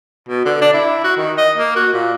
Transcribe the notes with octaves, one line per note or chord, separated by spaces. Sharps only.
B2
D3
D4
E4
F#4
D#3
D#5
A#3
F#4
A#2